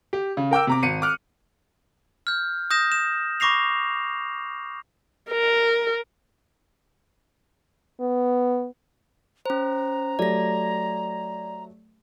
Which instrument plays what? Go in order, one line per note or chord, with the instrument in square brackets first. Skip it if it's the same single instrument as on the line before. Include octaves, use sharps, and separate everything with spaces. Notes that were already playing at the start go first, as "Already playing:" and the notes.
[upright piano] G4
C#3
A#4 G5 D6 E6
C3 A#5 D6
G#1 C#7 D#7
D6 F6 F#6
[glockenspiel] F6 G6
D#6 G6 A#6 E7
E7
B5 C#6 D6 A#6 C7 F7
[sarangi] A#4
[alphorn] B3
[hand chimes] C#4 C5 [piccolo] A#5
[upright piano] F#3 A3 G4 [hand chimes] D5 A#6